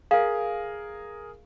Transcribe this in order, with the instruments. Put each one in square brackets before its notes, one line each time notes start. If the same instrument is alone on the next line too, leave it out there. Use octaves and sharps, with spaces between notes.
[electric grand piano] G#4 A#4 [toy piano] F5